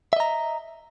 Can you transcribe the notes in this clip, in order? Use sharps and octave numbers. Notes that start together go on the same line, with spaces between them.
D#5 E5 A#5